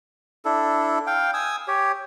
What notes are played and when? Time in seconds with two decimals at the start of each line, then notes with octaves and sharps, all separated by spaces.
0.45 D4 E4 A4
1.07 F5 G5
1.34 G#5 D#6 E6
1.68 G4 C#5